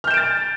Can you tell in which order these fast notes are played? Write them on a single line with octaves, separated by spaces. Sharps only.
F6 G6 E7 D7 A6